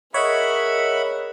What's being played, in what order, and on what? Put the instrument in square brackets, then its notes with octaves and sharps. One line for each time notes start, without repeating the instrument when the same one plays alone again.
[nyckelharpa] G#4 A#4 [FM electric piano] C#5 D#5 [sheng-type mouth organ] E5 F#5 B5